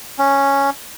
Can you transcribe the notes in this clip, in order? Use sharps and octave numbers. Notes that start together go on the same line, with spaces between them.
C#4